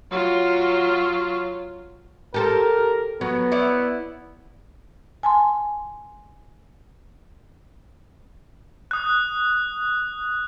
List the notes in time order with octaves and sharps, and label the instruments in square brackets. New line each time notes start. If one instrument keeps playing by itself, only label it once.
[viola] F#3 F4
[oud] G4 A4 C5 [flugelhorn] A#4
[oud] F#3 [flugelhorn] B3
[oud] E4 C#5 D5
[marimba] G#5 A5 C6
[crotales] D#6 F#6